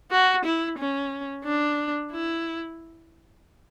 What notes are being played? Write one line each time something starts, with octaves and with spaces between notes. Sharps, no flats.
F#4
E4
C#4
D4
E4